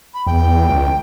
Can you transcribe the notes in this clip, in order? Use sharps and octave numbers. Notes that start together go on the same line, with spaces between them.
B5
E2 G5
C#2